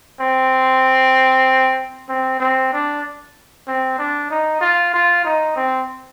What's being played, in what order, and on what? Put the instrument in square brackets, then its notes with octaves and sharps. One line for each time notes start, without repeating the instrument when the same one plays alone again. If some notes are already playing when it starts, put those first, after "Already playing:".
[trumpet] C4
C4
C4
D4
C4
D4
D#4
F4
F4
D#4
C4